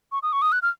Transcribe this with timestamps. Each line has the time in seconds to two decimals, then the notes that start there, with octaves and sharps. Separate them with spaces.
0.12 C#6
0.23 D#6
0.33 C#6
0.42 D#6
0.52 F#6
0.62 F6